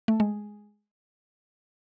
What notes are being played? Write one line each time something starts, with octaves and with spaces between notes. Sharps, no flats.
A3
G#3